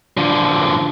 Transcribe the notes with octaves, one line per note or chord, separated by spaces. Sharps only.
D3 F3